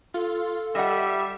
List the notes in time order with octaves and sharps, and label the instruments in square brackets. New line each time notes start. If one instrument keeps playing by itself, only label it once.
[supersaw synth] F4 [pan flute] A4
[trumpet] G3 [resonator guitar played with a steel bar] D#5 F#5 [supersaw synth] E5